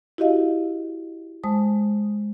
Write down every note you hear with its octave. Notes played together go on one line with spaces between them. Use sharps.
E4 F#4 G4 D#5 F5
G#3 C5 A5 D#6